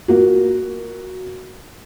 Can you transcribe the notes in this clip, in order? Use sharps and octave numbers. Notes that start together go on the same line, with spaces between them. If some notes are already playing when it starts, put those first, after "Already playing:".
A#3 F#4